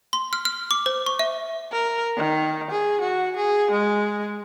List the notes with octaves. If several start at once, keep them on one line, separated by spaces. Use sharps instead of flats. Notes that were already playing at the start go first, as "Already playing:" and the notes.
C6
F6
F6
D6
C5
C#6
E5
A#4
D#3
G#4
F#4
G#4
G#3